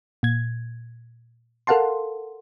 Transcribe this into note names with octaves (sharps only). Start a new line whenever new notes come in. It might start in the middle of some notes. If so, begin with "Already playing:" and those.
A#2 G#6
A4 A#4 F5 F#5 A5 C6